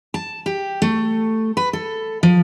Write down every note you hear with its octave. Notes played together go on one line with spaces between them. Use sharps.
A5
G4
A3
B4
A4
F3